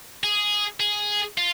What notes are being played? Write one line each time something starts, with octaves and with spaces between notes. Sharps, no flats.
G#4
G#4
F4